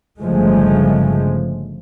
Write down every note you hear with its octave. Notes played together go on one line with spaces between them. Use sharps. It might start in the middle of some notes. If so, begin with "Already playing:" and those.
G1 G2 C#3 F3 G#3 A3